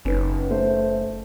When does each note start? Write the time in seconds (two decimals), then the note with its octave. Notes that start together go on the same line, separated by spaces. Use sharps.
0.05 F#1 C#4 D#4 B4
0.51 A3 C5